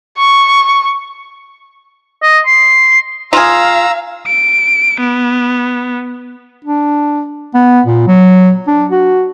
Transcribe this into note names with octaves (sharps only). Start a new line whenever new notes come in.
C#6
D#5
C6
F4 G#4 F5 A#5 E6
D7
B3
D4
B3
A#2
F#3
D4
F#4